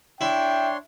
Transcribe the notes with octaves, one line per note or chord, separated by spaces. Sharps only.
D4 E4 C#5 G5 C6